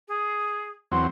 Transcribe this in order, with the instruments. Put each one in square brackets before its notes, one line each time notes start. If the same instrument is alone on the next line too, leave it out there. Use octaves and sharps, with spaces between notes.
[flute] G#4
[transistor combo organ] E2 F#3 C4 [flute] C6